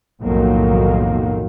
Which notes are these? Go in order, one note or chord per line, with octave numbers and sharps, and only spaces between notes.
B1 F2 A2 D#3 F#3 A#3